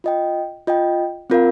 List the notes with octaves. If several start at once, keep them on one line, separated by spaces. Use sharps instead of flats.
F4 D#5 G5
F4 D#5 G5
C4 F4 A#4 F5